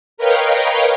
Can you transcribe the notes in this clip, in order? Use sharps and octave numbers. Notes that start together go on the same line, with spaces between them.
A#4 B4 C#5 D#5 F5 G5